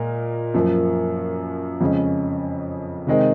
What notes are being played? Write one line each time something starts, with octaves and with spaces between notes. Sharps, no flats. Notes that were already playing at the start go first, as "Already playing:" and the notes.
Already playing: A#2 G#3 A#4
F#2 F3 A#3
F2 C#3 G#3 C#4
C3 D#3 G#3 C4